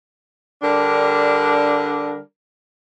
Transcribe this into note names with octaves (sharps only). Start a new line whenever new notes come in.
D3 G3 D4 A#4